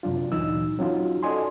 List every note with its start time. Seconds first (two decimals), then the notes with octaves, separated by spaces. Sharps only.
0.03 F#2 C3 F#3 D4 F4
0.32 D2 A#2 E3 F#3 D#4 E6
0.79 F#3 C#4 D#4 F4 F#4
1.23 F#4 A4 D5 D#5 G#5 C6